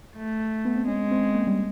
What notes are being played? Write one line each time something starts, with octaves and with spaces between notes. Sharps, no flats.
A3
B3
C4
G#3 C#4
C4
A#3
G3